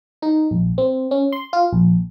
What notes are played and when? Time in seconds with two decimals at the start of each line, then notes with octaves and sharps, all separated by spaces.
0.22 D#4
0.51 A#1
0.78 C4
1.11 C#4
1.33 C6
1.53 F4
1.73 A#1